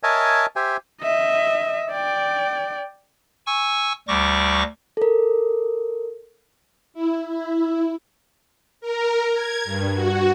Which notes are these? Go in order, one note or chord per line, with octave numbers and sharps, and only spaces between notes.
A#4 C#5 D#5 E5 G#5 A5
G4 C5 E5 G5 G#5
D#5 E5
D5 G5
G#5 C#6 E6
D2 G3 C#6 D6 A#6
A4 A#4
E4
E4
A#4
G#6
G2
F#4